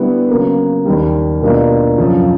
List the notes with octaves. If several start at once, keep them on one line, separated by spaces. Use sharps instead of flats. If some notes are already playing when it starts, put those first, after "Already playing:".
Already playing: D3 G3 B3 E4
C#3 F#3 A#3
D#2 D#3 G3
B2 G3 A#3 D4 F4
F#2 C#3 F3